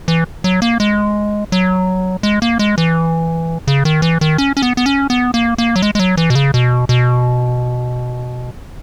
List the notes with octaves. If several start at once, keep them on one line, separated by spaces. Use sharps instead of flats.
E3
F#3
A#3
G#3
F#3
G#3
A#3
G#3
E3
C#3
D#3
E3
D#3
C#4
C#4
B3
B3
C#4
B3
A#3
A#3
F#3
G#3
G#3
F#3
E3
B2
C#3
B2
B2